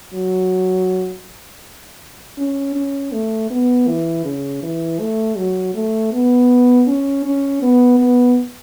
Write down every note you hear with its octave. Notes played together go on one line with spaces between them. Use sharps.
F#3
C#4
C#4
A3
B3
E3
C#3
E3
A3
F#3
A3
B3
C#4
C#4
B3
B3